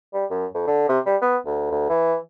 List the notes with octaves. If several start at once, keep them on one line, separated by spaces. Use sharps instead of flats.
G3
F#2
F2
D3
C3
G3
B3
D2
D2
E3